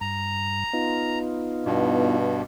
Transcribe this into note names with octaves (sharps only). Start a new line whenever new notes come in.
G2 A#5
B3 D#4 F4
G2 B2